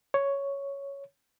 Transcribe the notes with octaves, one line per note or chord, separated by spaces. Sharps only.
C#5